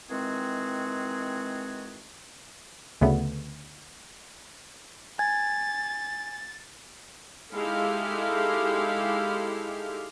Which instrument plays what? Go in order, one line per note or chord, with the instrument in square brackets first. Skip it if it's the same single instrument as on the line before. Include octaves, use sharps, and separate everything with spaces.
[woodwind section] D#3 E3 G#3 C4 F#4 G#4
[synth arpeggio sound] D2 C#3 A3 B3
[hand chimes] G#5 G#6 [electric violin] A6
[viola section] G#3 D#4 E4 G4 A4 F5